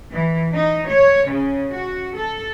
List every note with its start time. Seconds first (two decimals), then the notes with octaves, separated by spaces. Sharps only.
0.12 E3
0.54 D#4
0.88 C#5
1.29 C#3
1.71 F#4
2.18 A4